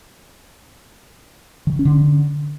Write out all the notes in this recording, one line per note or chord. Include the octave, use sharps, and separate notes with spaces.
D#3
D3
C#4
D3